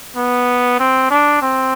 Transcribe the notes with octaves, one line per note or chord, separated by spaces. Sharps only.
B3
C4
D4
C4